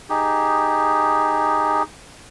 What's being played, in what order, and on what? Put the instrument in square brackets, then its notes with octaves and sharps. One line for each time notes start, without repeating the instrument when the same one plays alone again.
[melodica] D#4 G4 G#4